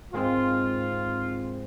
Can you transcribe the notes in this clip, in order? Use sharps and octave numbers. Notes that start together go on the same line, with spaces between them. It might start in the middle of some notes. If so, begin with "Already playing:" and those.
G#2 D#3 G#3 C4 F4